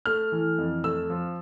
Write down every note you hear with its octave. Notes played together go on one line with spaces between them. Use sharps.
A3 F6
E3
F2
A3 E6
F3